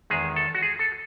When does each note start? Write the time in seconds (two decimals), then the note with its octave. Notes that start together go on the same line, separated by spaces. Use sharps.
0.10 E2 D#3 G#3 G#4
0.36 A4
0.55 F#4
0.63 G#4
0.79 A4